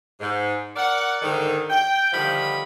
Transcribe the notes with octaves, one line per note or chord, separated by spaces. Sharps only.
G#2
A#4 D5 F#5
G#2 D3 D#3
G5
D3 D#3 F3 G3 B5